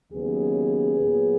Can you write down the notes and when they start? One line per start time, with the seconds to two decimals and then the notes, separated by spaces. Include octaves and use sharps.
0.12 D#2 C#3 F#3 B3 G#4
0.96 A#2 F#3 B3